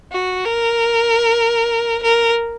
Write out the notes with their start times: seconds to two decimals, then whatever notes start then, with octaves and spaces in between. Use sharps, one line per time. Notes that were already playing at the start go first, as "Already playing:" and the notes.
0.12 F#4
0.45 A#4
2.03 A#4